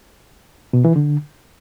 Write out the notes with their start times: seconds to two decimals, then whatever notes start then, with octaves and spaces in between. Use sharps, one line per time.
0.73 B2
0.85 E3
0.96 D3